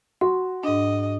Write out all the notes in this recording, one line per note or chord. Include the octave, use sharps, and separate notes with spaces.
F#4 C6
G#2 D4 D#5